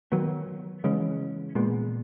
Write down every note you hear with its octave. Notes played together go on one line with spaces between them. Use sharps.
D#3 F#3 B3
C#3 E3 G#3 C#4
A#2 G#3 B3